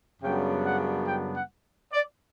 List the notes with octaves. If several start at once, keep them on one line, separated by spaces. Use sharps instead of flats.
F#2 C#3 G3 B3 D4 G5
F#5
G5
F#5
D5